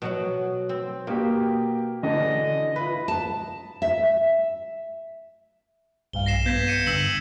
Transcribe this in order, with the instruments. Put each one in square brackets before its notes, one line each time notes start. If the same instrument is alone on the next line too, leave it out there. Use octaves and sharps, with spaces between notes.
[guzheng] B2 F#3 F#5
C4
[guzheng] B2 [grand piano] A#3 G4
[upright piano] D3 [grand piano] E3 [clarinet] D#5
[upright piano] E4 F4 [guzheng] B4 [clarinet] B5
[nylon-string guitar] A5
E5
[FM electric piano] B1 G2 F5 [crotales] G7
[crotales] A#6 C7 E7
[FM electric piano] B3 [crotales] G6 G#6 B6
[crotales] C#7 D#7 E7
[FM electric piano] G2 D3 [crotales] E6 B6 F#7